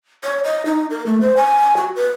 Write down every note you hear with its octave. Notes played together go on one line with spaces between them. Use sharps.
C#5
D#5
D#4
A#4
A3
C5
G#5
F#4
B4